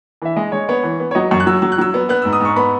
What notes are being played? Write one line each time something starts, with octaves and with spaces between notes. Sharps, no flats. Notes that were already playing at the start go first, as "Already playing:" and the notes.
E3 E5
G#3 D#5
G#3 C#5
B3 C#5
E3
B3
C#5
F#3 D#5
F#2 C#6
F#6
F#3 E6
F#3 E6
F#6
F#3 E6
B3
B3 F#6
G#2 E6
D#6
G#2 C#6
B3 B5